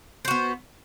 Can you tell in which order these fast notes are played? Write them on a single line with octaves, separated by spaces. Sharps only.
C5 F#4 B3